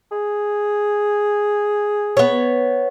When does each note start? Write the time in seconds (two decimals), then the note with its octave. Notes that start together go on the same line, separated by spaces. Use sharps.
0.12 G#4
2.17 B3 C#5